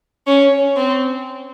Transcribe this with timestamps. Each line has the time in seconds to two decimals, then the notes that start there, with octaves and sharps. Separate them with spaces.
0.27 C#4
0.76 C4